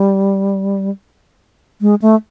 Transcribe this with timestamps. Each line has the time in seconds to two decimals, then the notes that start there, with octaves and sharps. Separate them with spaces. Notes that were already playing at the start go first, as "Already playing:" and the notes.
Already playing: G3
1.81 G#3
2.02 A3